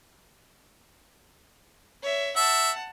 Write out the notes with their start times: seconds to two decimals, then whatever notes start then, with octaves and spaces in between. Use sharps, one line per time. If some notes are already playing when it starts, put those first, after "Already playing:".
2.02 C#5 E5
2.36 E5 F#5 A5